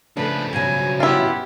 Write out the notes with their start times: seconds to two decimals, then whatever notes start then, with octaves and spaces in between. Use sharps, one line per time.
0.17 C#3 F3 A3 D4 B4
0.53 G2 B2 F#3 G#5
1.00 B3 E4 F4 G4